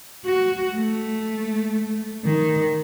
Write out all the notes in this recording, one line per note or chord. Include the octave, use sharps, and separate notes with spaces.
F#4
A3
D#3